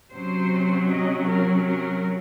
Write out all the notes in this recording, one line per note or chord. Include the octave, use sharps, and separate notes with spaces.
C3 F#3 C#4 C5
D#5
A#4
A#4